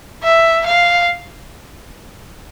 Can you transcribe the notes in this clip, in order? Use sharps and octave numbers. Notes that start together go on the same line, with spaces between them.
E5
F5